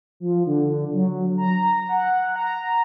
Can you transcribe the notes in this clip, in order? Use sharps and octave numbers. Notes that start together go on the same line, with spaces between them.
F3
D3
F#3
A#5
F#5
A#5